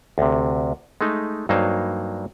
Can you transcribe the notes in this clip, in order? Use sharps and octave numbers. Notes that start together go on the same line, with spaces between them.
D2 C3
G#3 A3 D#4
G2 F#3 A#3 D#4 C5 C#5